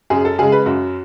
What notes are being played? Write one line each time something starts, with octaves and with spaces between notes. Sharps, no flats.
F#2 G#4
A4
C#3 G#3 G#4
B4
F#2 F#4